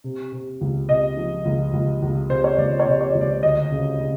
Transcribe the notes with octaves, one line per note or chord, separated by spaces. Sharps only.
C3
C3
C#2
C3 D#5
F3
C#2
C#2
C#2
C3 C5
C#5
C#2 D5
C#5
C3
C#5
C#2
D5
D2 D#5
C#3
C#3